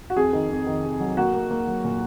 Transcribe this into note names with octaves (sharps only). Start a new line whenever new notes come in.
F#4
F2 G#4
D#3
F2
D#3
C3
F#3
A#3 F#4
A#3
A#3
F#3
A#2